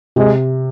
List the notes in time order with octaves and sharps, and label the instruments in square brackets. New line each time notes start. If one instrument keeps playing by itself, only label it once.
[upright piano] C3 [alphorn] G#3